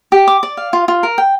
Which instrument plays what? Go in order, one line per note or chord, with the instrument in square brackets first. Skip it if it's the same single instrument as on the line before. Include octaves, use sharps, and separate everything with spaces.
[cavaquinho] G4
D6
D5
F5
F4
F4
A#4
G5